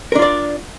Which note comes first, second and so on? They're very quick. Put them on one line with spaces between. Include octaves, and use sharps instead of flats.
A#4 D4 F4 D5